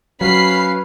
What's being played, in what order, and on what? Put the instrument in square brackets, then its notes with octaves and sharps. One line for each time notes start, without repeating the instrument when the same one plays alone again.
[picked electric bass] F#3 [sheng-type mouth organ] C#4 B4 F5 [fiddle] B5 [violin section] C7